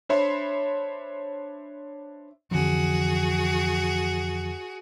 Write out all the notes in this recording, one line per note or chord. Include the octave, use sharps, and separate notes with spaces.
D4 C5 C#5 E5 B5 C6
F2 D3 E3 F#4 G#4